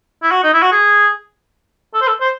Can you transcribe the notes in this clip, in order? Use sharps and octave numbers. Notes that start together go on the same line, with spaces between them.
E4
F#4
D#4
E4
F#4
G#4
A4
C5
A4
C5